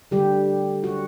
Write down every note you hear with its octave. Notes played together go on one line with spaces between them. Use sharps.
D3 G3 G4
F#4